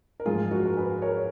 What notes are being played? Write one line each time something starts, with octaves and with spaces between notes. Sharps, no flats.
A#4
G#2 F3 G#3 F4 G#4
F#4 A#4
A#4
G#4 B4
A#4 C#5